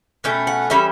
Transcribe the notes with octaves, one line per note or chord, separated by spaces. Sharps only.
B2 A3 C#4 G5
F#5
E3 G3 C#4 E5